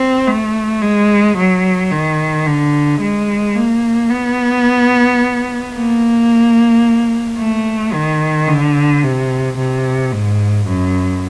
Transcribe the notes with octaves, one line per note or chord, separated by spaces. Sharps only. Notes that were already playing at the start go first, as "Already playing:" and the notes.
Already playing: C4
A3
G#3
F#3
D#3
D3
G#3
A#3
B3
A#3
A3
D#3
D3
C3
C3
G#2
F#2